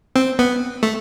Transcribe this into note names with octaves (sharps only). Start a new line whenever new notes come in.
C4
B3
A3